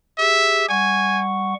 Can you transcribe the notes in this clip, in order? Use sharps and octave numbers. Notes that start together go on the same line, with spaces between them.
G4 G#4 E5
G3 F#5 G#5 C#6